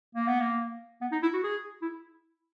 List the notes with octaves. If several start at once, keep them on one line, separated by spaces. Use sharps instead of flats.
A#3
B3
A#3
B3
D#4
E4
F#4
G#4
E4